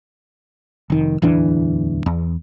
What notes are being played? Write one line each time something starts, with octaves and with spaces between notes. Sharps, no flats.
F1 D#3
D1 E2 E3 D4
E2